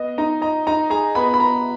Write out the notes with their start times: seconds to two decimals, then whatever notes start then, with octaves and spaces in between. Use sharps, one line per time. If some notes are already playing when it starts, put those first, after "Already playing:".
Already playing: B3 D#5
0.18 D#4 A#5
0.42 D#5 A#5
0.67 D#4 A#5
0.90 G#4 A#5
1.15 B3 B5
1.34 B5
1.40 B3 A#5